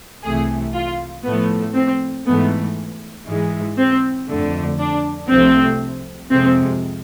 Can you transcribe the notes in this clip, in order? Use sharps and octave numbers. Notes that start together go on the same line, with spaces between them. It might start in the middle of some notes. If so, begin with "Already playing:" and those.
C2 C3 E3 A3 G#4
F4
A2 F3 A3 B3
C4
G#2 E3 A3 B3
G#2 E3 G#3
C4
F2 D3 A3
D4
C2 C3 F3 A3 C4
F2 C3 F3 G#3 C4